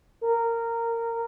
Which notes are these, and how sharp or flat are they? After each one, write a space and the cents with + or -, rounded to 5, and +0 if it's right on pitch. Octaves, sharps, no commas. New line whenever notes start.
A#4 -15